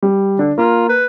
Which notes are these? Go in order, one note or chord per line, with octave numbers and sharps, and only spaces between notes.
G3
D3 D4
A#3 F4
B4